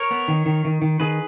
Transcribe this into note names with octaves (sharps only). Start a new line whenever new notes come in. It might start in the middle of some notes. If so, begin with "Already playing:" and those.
Already playing: A#4 C#5
B3
D#3
D#3
D#3
D#3
D#3 G#4 B4